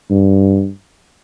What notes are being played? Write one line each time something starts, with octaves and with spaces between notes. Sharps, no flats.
G2